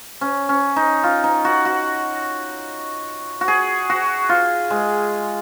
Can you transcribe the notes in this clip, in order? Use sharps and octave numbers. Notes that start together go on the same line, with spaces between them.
C#4
C#4
D#4
F4
D#4
F#4
F#4
F#4
G#4
F#4
F4
G#3